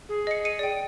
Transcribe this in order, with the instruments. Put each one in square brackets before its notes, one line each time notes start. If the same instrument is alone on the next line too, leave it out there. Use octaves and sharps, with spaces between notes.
[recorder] G#4
[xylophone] D#5 C#7
C#7 D#7
D5 G5